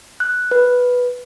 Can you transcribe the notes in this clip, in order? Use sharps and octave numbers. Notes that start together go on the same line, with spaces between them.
F#6
B4